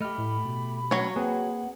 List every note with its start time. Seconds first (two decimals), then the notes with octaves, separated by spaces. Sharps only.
0.01 A3 G4 D#5 B5 F6
0.18 A2
0.45 B2
0.91 F#3 A3 C#4 C#5 G5
1.16 A#3 C4 G#4 B4 F#5